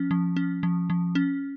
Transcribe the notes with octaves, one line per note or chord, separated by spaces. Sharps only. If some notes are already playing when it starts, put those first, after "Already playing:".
Already playing: F3 C#4
F3
C#4
F3
F3
C#4